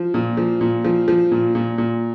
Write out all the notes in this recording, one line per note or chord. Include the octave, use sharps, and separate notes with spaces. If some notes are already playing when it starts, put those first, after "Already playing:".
Already playing: F3
A#2
F3
A#2
F3
F3
A#2
A#2
A#2